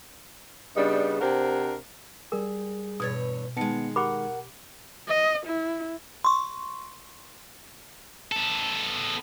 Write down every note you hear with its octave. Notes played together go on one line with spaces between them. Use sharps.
C#3 G3 B3 D4 D#4
C3 D4 A#4 C5 F#5
G3 G#4 A#4
E2 G2 B2 C#5 G#6 A6
D#3 G#3 B3 A5 C#7
G4 A#4 F#5 B5 D6
D#5
E4
C6 C#6
B3 A4